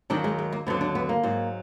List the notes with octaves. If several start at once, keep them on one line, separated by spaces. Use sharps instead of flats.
D#2 D#3 F#3 D4
G#3
G#3
A#3
D#2 D3 F#3 B3
D4
B3
A#3
G#2 F#3